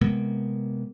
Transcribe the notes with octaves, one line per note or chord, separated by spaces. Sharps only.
C3 G#3 A#3 B3